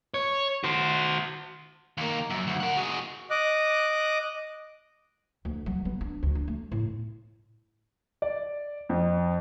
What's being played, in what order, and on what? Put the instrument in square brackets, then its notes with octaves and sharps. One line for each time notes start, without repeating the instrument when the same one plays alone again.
[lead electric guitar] C#5
F#4 C5
[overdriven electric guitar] D#2 A#3
F#2
D2
A#4 F#5
F#4 G#4
[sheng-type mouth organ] D#5 D6 F#6
[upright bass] D2
F#3
B3
D4
D2
D4
A3
A2
[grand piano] D5
F2